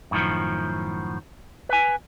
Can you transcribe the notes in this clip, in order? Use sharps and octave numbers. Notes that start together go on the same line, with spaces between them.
F#2 A2 C3 D#3 F3
B4 G#5